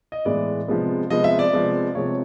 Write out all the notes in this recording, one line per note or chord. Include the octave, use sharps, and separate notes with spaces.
D#5
A2 E3 G#3 B3 D5
C3 F3 G#3 B3
C3 F3 G#3 B3 D#5
E5
D5
C3 F3 G#3 B3
C3 F3 G#3 B3 C#5